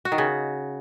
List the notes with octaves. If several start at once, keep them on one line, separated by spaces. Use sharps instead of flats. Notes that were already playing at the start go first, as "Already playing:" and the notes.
F#4
D#3
C#3